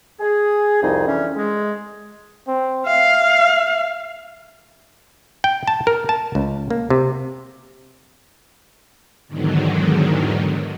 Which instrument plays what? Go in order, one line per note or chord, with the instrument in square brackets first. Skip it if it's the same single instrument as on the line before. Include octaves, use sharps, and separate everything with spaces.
[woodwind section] G#4
C2 F2 D#4 G#4
D3 E3 C#4
G#3
[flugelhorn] C4
[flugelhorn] E5 [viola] F5
[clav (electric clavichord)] G5
A5
A#4
A5
C#2
A#3
C3
[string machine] E2 G#2 D3 D#3 F#3